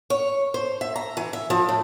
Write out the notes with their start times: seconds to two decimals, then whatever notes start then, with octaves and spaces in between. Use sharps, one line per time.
0.10 C#5
0.54 C5
0.81 E5
0.96 A#5
1.17 E3
1.33 E5
1.50 F3
1.69 A2